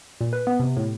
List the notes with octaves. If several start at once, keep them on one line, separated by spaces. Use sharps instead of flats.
A#2
B4
B3
C3
A2